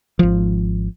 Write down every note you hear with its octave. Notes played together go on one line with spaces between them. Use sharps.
G#1 F3